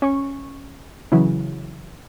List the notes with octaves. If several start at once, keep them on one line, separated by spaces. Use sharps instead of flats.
C#4 C#6
C#3 E3 F#3 E4